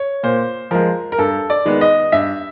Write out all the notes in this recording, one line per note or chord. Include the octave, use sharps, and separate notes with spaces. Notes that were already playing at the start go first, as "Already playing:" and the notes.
Already playing: C#5
A#2 C5
F3 G#3 A#4
A#4
G2 A4
D5
D#3 G#3 B3
D#5
G2 E5